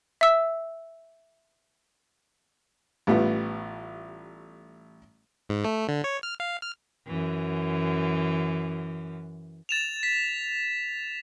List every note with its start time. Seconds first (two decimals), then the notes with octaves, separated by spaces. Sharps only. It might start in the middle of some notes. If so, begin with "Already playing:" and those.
0.21 E5 E6
3.07 A1 G3 A3 B3 F4
5.49 G#2
5.64 A3
5.89 D3
6.04 C#5
6.23 F6
6.40 F5
6.62 F6
7.07 F#2 E3
9.69 A6 E7 F7
10.03 B6